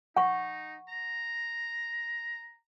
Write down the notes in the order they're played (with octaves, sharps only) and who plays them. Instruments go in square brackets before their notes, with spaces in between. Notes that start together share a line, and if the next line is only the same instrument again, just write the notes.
[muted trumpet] D#4 [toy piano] F#5 C#6
[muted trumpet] A#5